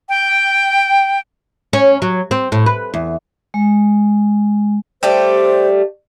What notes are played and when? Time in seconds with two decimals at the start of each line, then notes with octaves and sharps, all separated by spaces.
0.09 G5
1.73 C#4
2.02 F#3
2.31 C4
2.52 A2
2.66 B4
2.94 E2
3.54 G#3
5.03 G3 A3 G4 C5